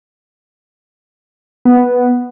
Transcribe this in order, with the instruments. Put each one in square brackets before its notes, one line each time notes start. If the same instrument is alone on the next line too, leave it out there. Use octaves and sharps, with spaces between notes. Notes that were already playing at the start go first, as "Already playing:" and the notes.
[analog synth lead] B3